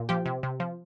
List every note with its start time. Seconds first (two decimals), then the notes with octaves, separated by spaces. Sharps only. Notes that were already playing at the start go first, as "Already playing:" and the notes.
Already playing: A#2
0.09 F3 G4
0.26 C3
0.43 C3
0.60 F3